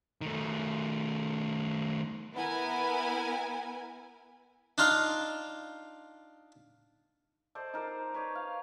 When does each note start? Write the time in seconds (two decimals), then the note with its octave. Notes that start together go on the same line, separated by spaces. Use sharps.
0.21 D#3 A3
2.35 B3 E4 A#4 G#5
4.78 D4 D#4 F4 F5
7.55 A4 C5 D5 D#5
7.73 D#4 A#4 C5 D5
8.14 B4 C#5 D5
8.35 F5